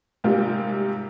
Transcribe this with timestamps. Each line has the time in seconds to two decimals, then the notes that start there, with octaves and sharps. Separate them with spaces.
0.24 G#2 C3 G3 A#3 F4